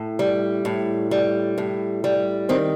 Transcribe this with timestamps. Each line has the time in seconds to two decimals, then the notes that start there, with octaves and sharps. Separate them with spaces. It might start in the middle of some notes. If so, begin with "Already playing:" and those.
Already playing: A2
0.19 G3
0.65 A2
1.11 G3
1.58 A2
2.04 G3
2.49 D#3 C4